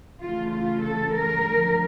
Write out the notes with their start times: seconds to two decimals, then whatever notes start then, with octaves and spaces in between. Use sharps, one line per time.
0.21 C#3 E3 A3 F4
0.52 F4
0.83 A4
1.15 A#4
1.46 D3 F3 A3